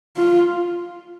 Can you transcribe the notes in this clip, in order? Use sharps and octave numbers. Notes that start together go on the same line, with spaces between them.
F4